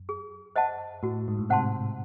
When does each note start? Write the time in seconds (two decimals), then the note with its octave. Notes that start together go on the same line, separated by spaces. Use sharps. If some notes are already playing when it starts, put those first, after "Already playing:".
Already playing: F#2
0.09 G#4
0.56 C5 D#5 F#5 A5
1.03 A2 F#4
1.28 G#2
1.39 A2
1.50 C3 C5 F#5 A5 C6